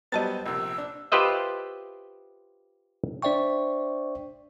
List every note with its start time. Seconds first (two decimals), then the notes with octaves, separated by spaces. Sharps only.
0.12 F#3 G3 B3 C5 D#5 A5 A6
0.46 A#1 C3 E6
0.78 D4
1.12 F4 G4 B4 C5 D#5 E5
3.22 D4 C5 D5 E5 G5 C#6